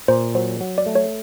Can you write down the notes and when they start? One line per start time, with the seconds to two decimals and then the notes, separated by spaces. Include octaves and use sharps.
0.08 A#2 C5
0.35 F#3 C5
0.60 F#3
0.78 D5
0.86 A3
0.95 C#5